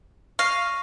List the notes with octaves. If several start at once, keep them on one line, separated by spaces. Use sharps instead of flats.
F5 C#6 A#6 D#7